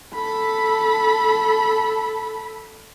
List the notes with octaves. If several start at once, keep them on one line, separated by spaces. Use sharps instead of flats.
A4 B5